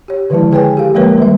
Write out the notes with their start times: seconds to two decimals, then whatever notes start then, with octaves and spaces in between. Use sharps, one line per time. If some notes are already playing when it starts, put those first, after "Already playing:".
0.08 G4 C#5
0.30 D3 D#3 F3 G#3 E4 A5
0.52 G#4 B4 C#5 G5 G#5
0.77 G4 A4 F5
0.94 F3 G#3 A#3 A#4 B4 C#5
1.18 D#3 G3 E5